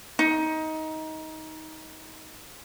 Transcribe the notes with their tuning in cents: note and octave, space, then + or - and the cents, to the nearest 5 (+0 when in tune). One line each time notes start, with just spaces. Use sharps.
D#4 +20